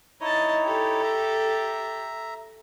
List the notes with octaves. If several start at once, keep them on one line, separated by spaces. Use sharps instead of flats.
D#4 E4 C#5 D#5 A5
G4 A4
E5 A#5